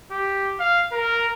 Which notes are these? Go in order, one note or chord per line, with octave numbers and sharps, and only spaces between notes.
G4
F5
A#4